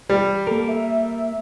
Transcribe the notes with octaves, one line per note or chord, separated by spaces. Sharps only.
G3
A#3 A4 A#4
E5